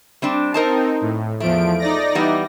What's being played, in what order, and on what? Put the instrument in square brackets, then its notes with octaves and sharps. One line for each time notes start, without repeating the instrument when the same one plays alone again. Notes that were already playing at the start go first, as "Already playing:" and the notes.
[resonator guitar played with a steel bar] G3 C4 D4
[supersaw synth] C4 D#4 [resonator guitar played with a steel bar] A#4 C5 A5
[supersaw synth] A2
[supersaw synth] E2 F3 D7 [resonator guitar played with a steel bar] A3
[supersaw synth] D#4 D5 A#6
[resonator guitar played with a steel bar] E3 G3 B3